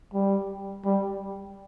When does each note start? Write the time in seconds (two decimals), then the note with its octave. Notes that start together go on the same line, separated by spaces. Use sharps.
0.13 G3
0.84 G3